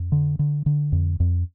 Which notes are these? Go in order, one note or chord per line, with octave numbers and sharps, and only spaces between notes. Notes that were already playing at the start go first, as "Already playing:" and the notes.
Already playing: F2
D3
D3
D3
F2
F2